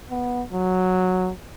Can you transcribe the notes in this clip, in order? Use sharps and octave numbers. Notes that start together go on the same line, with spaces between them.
B3
F#3